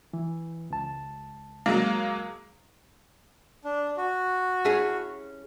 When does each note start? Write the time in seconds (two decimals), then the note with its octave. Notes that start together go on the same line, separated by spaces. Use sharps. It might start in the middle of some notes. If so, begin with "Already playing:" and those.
0.13 E3
0.70 C#2 A5
1.66 F#3 G#3 A#3
3.65 D4
3.97 F#4
4.65 C#4 E4 G#4